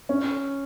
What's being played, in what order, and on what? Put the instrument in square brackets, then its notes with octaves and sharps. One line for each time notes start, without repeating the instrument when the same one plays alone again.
[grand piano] C#4